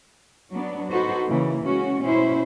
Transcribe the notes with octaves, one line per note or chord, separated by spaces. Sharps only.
F#3 B3 D4
D#4 F#4 A4 B4 C5
C#3 E3 A#3
C#3 G#3 C#4 F#4
B2 C#4 E4 C5